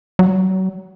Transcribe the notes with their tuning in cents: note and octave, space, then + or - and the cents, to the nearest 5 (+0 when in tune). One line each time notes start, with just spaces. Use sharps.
F#3 +30